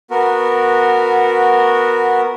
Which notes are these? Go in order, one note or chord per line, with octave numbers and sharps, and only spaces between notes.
B3 F#4 A#4